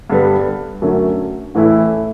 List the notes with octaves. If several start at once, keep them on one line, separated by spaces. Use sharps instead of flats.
G2 D3 G3 B3
F#2 D3 F#3 A3 C#4
A1 A2 E3 A3 E4